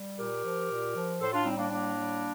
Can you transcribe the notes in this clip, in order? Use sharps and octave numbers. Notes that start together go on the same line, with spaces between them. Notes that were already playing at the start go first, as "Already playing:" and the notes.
Already playing: G3
A#2 G4 A#4
F3
A#2
F3
A2 A4 C5
D4 F4
G3 C4 D#4
A#3 D4
A2 A#3 D4
G3